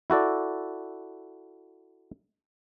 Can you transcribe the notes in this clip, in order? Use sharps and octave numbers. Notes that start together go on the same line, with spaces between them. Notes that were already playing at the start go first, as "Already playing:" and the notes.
E4 F#4 A4 D5